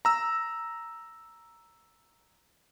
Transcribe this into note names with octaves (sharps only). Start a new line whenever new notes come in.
A#5 E6